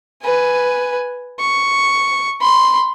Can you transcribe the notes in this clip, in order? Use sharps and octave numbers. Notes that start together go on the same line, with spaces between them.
B4 G#5
C#6
B5 C6